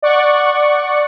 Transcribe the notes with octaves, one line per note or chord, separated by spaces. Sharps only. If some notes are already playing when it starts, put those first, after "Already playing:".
D5 F#5 C#6